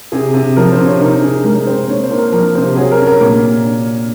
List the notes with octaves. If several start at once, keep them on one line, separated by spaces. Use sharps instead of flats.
C3 G#4
C3
F3 A#4
C5
C3
C#5
D#4 A#4
D#4 G#4
G#3 A#4
C4 C5
A#3 C#5
C5
A#3
A#4
F3 A#4
C3 C5
F#3 G#4
A#4
C#4
A#4
A#2 A#4